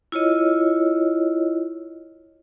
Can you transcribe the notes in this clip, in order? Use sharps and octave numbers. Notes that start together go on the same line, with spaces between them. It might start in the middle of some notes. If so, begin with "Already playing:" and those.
E4 F4 C#5 D#5